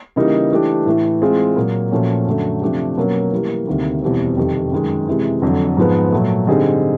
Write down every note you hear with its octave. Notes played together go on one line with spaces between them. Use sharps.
C#3 E3 G3 A#3 D#4
E3 A3 D4 G4
A2 E3 A3
E3 G#3 C4 F4 G#4
A#2 F#3 A#3
A#2 F3 A3 C#4 F#4
F#2 D3 F#3 A3
C3 F3 A3 D4 G4
B2 F#3 A#3 C#4
E3 G3 A#3
D2 C3 D#3 G3 A#3
E2 B2 G3 C4
F2 C3 D#3 G3
F#2 D#3 G#3
C3 E3 G#3
F2 D3 F#3
G#2 F3 G#3 B3
A#2 F#3 A3
D3 G3 C4 D#4 G#4